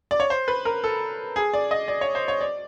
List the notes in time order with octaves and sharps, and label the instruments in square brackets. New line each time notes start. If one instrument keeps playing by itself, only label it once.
[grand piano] D5
C#5
C5
B4
A#4
A4
G#4
D5
D#5
D5
C#5
C5
C#5
D5